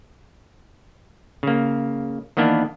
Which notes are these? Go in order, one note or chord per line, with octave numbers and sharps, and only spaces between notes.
C#3 A#3
D#3 E3 A#3 B3 D4